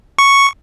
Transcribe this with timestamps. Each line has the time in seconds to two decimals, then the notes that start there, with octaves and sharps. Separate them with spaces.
0.18 C#6